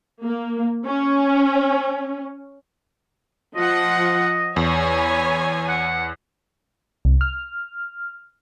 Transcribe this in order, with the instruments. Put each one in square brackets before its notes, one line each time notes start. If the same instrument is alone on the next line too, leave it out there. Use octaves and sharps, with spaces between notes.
[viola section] A#3
C#4
[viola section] F3 F#5 [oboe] D#5
[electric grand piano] E2 [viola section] C#5 G#5
[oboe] B5
F#5
[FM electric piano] C2
F6